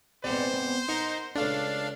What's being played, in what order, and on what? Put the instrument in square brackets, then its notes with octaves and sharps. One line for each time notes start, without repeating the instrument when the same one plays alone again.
[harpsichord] E2 G#2 C3 [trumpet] C5 [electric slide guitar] D5 F#5
[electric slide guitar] B3
[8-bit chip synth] D#4 [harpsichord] A#4 [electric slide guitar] F#5
[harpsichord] C#2 A3 [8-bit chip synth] D4 F5